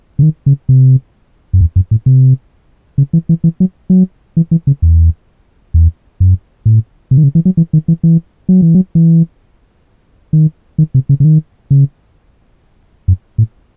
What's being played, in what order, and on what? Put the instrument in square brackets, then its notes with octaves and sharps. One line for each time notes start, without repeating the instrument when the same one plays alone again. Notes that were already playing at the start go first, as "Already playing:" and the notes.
[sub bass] C#3
D#3
C#3
C3
F#2
E2
F#2
A2
C3
C#3
E3
E3
E3
F#3
F#3
E3
E3
C#3
E2
E2
F#2
A2
C3
D#3
C#3
E3
F#3
E3
D#3
E3
E3
F#3
E3
F#3
E3
D#3
D#3
C3
C#3
C#3
D#3
C#3
F#2
A2